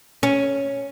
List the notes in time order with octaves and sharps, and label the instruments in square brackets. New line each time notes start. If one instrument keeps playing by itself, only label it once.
[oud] C#4